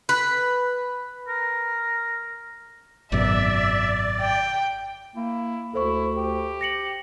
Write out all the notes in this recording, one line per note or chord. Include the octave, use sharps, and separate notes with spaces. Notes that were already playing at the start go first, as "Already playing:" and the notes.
B4
A#4
G#1 F#2 B2 D5 E5
G5
A#3 E4
D2 E4 A4 C5 C#6
G4
A#6 C#7 F#7